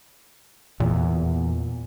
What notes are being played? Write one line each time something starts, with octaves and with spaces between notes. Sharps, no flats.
E2 A#2